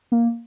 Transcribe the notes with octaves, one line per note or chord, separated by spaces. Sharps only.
A#3